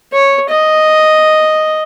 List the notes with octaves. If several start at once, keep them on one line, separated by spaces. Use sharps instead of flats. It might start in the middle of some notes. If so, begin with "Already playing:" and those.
C#5
D#5